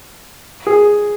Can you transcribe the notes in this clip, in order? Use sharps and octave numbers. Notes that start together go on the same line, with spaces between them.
G#4